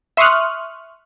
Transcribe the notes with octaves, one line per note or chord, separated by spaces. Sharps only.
E5 C6 C#6 D#6 F6 F#6